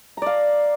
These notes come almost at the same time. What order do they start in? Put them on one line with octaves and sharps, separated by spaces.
A#5 D5 F5